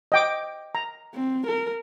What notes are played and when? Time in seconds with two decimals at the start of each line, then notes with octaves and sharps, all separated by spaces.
0.12 D#5 G5 D6
0.75 A#5
1.14 C4
1.47 A#4